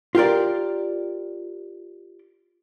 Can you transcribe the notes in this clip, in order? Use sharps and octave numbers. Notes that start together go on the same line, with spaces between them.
F4 G4 A#4 D5